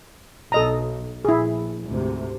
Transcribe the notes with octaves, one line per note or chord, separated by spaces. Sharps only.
B1 A4 D#5 A#5
A#1 E4 G#4
D2 G#2 C3